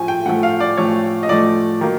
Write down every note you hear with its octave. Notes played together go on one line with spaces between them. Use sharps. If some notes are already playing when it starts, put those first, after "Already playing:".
Already playing: A2 F3 A3 G#5
G5
A2 F3 A3 F#5
F5
D5
A2 F3 A3 C#5
D#5
A2 F3 A3 D5
D#3 F#3 A#3